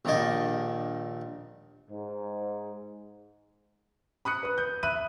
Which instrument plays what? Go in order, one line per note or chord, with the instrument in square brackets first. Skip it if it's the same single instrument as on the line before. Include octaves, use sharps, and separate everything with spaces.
[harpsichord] A#1 D#2 D#3 D4 D#5 G#5
[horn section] G#2
[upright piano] B5 D#6 F#6 C#7
B4 D#6
G6
E5 B5 F#6 D#7